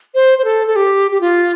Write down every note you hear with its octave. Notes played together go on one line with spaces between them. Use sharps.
C5
C5
A4
A4
G4
G4
F4